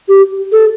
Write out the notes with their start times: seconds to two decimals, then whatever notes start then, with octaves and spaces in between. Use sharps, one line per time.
0.08 G4
0.52 A4